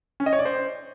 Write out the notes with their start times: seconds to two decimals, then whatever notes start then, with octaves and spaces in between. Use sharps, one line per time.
0.20 C#4
0.26 D#5
0.33 C#5
0.39 D5
0.45 C5